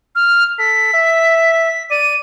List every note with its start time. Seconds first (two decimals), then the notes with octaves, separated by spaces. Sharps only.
0.15 F6
0.59 A4 B6
0.93 E5
1.91 D5 D#7